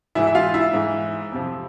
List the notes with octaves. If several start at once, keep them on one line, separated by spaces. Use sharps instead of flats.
G#2 E3 E4 E5
E5
F4 F5
E4 E5
G#2 E3
F2 C3 F3